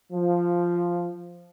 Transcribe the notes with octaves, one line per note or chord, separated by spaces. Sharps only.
F3